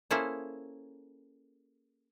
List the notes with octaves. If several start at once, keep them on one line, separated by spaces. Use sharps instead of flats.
A#3 C#4 E4 G#4 A4 C5